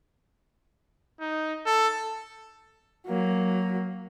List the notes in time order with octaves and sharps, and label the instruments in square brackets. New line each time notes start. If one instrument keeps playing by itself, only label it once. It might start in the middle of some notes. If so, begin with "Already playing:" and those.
[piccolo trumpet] D#4
A4
[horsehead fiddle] F#3 A#3